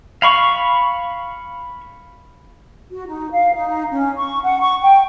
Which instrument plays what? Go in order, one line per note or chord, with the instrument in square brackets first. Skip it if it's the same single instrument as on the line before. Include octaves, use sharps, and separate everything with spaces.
[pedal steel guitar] F5 B5 C#6
[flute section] F#4
D#4
F5
D#4
C#4
C#6
F#5
C#6
G5